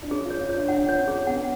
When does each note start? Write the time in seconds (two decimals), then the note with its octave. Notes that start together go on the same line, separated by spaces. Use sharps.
0.03 D4
0.10 C#4 G#4
0.25 F4
0.30 C#5
0.40 F4
0.49 D4 C#5
0.68 D4 F#5
0.88 C#5
0.99 C#4
1.08 G#4
1.27 B3 F#5